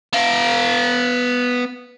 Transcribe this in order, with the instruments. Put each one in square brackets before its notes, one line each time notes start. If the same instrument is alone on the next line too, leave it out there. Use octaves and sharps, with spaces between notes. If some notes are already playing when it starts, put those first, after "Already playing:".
[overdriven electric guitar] B3 F5